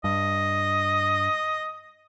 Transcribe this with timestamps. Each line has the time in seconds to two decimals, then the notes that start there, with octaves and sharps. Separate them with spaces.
0.04 G2 D#5